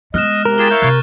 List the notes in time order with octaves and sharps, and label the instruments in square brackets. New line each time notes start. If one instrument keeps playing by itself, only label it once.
[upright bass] G#3 B3 [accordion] D#5 [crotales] F6 F#6 E7
[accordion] C3 [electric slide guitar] A#4
[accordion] F4 G4 G#4 [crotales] A6 E7 G7
[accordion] E4 C#5 F5 [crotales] G6
[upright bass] C3 [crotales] C#6 F#6